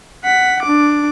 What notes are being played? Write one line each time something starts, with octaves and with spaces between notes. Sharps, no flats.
F#5 B6
D4 D6